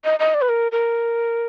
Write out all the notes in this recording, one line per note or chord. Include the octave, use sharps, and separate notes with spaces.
D#5
D#5
D5
B4
A#4
A#4